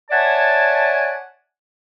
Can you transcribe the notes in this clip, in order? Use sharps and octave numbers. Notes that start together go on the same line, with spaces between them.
C#5 D5 E5 F#5 G#5 A5